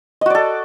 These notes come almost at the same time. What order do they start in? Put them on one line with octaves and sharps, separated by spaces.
D#5 F#4 D5 A4